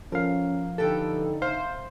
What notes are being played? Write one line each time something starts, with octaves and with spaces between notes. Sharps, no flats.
F3 C#4 A#4 F5
D3 D#4 G4 A4 B4 G5
C3 C5 F5